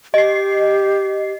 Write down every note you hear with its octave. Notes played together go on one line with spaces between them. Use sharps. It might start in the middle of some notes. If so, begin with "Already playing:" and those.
G4 D#5 C7